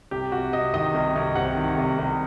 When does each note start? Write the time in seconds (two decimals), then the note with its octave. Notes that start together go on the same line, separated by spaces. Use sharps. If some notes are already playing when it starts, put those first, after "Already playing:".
0.11 C2 G4
0.32 C2 F#4
0.53 C3 D#5
0.74 D#3 D#5
0.94 C2
1.16 C2
1.35 C3 F#5
1.56 D#3
1.78 C2
1.98 C2